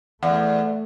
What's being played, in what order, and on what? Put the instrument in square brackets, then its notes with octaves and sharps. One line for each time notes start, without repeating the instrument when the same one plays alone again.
[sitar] E2 [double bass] A3 [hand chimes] F#5